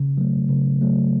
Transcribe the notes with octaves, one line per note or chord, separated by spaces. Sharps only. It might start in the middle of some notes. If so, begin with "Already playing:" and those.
Already playing: C#3
F#3 A3
C#3
F#3 A3